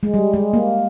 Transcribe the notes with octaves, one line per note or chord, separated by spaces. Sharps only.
G#3
G3
G#3
A#3